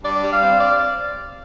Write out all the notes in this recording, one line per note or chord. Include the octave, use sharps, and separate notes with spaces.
G2 D5
G3
F5
C4
D5